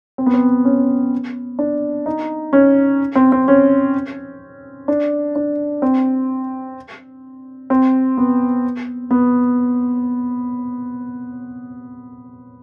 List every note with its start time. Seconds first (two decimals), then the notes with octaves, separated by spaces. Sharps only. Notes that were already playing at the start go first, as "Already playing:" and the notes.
0.18 C4
0.26 B3
0.34 C4
0.65 C#4
1.59 D4
2.06 D#4
2.53 C#4
3.15 C4
3.32 C4
3.48 C#4
4.88 D4
5.36 D4
5.82 C4
7.70 C4
8.17 B3
9.11 B3